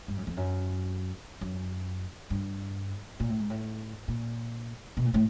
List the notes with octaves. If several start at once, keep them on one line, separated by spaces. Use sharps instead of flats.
G2
F#2
F2
F#2
F#2
G2
A#2
A2
G#2
A2
A#2
B2
A#2
A2